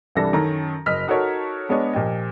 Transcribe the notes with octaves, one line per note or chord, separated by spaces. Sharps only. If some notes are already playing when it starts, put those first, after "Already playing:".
C2 E3 G3 D4 A4 A#6
F#2 D#3 C#4 A4 A#5
F#1 D#5 F6 B6
D#4 F#4 A4 A#4 C#5
G#3 B3 D4 G#4 C#5 D#5
A#2 F3 G4 D#5